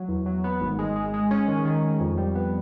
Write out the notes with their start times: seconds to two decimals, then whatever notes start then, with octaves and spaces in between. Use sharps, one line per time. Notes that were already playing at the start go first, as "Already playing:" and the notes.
Already playing: F#3
0.09 E2
0.26 F#3
0.44 B3
0.61 G#1
0.79 G#3
0.96 G#3
1.14 G#3
1.31 C#4
1.48 D#3
1.65 D#3
1.83 D#3
2.00 F2
2.18 G3
2.35 B3